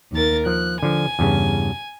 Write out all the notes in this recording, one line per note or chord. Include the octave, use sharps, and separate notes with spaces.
D#2 A#4 A6
F3 F#6
D3 F3 G#5
E2 G2 C#3